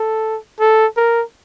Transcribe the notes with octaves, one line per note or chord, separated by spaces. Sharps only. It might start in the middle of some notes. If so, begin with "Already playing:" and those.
Already playing: A4
A4
A#4